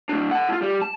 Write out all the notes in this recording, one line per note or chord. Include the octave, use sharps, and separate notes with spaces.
A2 D4
F#5 A5
E4 F4
G3
A5